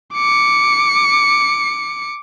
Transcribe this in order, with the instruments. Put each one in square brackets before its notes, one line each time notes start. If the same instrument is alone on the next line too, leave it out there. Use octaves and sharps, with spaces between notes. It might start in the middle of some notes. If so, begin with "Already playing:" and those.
[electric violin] D6 C#7